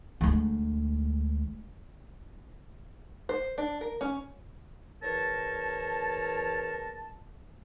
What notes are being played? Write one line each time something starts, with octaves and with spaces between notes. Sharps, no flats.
D2 G#3
C5
D4
A#4
C#4
E2 A#4 C#5 A5